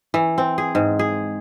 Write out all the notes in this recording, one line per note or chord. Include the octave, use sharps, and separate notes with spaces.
E3
C4
G#4
G#2
G#4